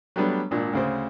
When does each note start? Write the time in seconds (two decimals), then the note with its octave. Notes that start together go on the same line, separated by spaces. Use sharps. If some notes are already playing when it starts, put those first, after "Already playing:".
0.16 F#3 G3 A3 B3 D4
0.51 G#1 A#2 D4
0.73 D2 C#3 C5